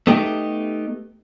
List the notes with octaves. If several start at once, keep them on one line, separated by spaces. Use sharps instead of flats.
A3 B3 D#4 G4